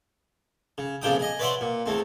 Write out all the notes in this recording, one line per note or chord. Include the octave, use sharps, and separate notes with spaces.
C#3
A#1 F2 C#3 D4 G5 D#6
G#4 D#5
B4 C#5 D5 E5 F#5 C6
A#2
E2 A3 C4